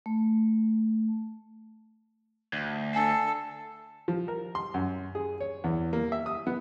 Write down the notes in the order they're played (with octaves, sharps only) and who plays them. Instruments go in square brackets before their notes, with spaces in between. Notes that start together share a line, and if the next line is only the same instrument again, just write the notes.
[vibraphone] A3
[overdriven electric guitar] D2
[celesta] D4 G#5 C7 [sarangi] A4
[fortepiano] F3
A#4
C6
F#2
G#4
C#5
E2
A#3
E5
D#6
B3